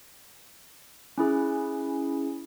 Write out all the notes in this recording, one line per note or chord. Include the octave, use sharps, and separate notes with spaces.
C#4 E4 G#4